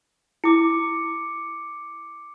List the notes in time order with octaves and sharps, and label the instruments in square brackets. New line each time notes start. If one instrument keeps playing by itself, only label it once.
[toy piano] E4 [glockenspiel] D6 C#7